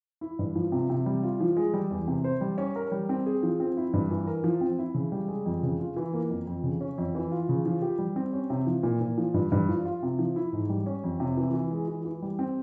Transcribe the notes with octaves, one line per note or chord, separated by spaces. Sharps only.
E4
G2
F3
C3
C3
G3
F4
F3
G#3
G3
E2
C3
C5
G3
C#4
A#4
G3
C4
G#4
F3
C4
E4
G2
E3
A#4
F3
C4
E4
C#3
G3
G#3
F2
C#3
F4
E3
A#3
F2
F2
C#3
C#4
F2
E3
F4
C#3
F3
G4
G3
C4
C#4
C3
F3
A#2
A#2
F3
G2
G2
F3
F4
C3
F3
E4
G#2
G3
C#4
F2
C3
E3
E3
G#3
E3
E3
G3
C4